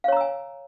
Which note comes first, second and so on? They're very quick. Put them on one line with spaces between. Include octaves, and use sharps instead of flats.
F5 C#5 A#5 E6 G#5